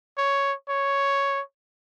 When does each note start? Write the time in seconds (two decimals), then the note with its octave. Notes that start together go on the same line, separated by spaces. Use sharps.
0.18 C#5
0.69 C#5